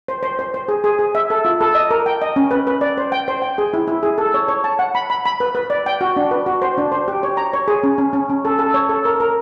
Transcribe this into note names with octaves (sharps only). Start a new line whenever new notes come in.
C5
C5
C5
C5
G#4
G#4
G#4
E5
A4
F4
A4
D#5
A#4
G5
D#5
C#4
B4
B4
D5
C5
G5
C5
G5
G#4
E4
E4
G#4
A4
C#5
C#5
A5
F#5
B5
B5
B5
B4
B4
D5
G5
F#4
D4
B4
F#4
C5
D4
C5
G4
C#5
A#5
C#5
G#4
C#4
C#4
C#4
C#4
A4
A4
C#5
A4
A#4
A#4